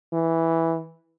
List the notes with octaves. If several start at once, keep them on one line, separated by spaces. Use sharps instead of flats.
E3